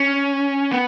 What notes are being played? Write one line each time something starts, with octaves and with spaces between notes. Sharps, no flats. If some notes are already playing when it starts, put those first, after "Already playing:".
Already playing: C#4
B3